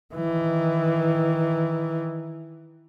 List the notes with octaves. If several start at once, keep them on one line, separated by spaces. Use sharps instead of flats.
D#3 E3